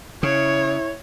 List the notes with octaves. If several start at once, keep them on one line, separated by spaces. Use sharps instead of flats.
C#3 E4 C#5